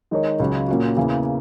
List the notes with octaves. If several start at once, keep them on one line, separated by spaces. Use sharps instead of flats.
D#3 G#3 D#4 A#4 C#5
C#2 C#3 F#3
A#2 A#3 C#4 F#4
E2 C#3 E3 A#3